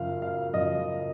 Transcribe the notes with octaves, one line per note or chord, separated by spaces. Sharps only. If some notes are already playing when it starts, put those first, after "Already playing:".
Already playing: F#2 C#3 F3 F5
F5
F#2 C#3 F3 D#5